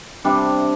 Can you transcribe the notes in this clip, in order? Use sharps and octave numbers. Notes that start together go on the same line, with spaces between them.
C3 G3 D4